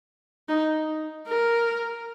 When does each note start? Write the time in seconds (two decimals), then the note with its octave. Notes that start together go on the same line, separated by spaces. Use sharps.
0.48 D#4
1.28 A#4